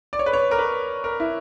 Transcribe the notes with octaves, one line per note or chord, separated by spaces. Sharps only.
D5
C#5
B4
C#5
A#4
B4
A#4
E4